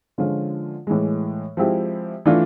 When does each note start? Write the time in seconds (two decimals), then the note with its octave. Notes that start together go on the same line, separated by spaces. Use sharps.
0.18 D3 F3 G#3 C#4 F4
0.87 A2 E3 G#3
1.57 F3 G#3 C4 E4 G4
2.25 E3 A3 D4 F4